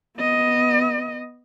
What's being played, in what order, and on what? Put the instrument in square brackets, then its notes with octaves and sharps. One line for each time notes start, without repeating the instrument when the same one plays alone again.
[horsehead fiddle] B3 D#5